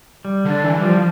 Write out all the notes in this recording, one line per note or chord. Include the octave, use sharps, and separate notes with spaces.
G3
D3
D4
E3
G3
F3